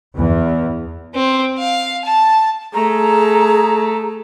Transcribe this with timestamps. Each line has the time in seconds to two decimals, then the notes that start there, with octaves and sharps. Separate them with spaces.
0.17 E2
1.15 C4
1.58 F5
2.05 A5
2.74 A3 G#4 A#5